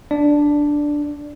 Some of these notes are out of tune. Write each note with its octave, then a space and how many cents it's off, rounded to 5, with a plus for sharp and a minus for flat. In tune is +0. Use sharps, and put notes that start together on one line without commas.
D4 +0 D5 +0